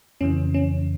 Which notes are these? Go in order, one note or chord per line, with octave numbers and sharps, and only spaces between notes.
F2 C#3 E3 C#4
C#4